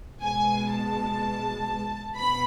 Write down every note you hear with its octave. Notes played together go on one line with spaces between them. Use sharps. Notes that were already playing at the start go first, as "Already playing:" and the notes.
B2 G#3 G#5
A5
B2 B5